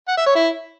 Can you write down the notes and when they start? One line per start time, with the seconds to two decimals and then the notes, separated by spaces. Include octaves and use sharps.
0.08 F#5
0.17 E5
0.26 C#5
0.35 E4